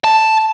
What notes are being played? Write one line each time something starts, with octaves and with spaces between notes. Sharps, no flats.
A5